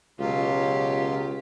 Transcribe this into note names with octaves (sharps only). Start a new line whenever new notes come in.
C#2 B2 F#3 F4 G4